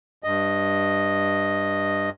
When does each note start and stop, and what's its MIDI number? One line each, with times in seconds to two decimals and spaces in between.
0.24 2.10 43
0.24 2.10 75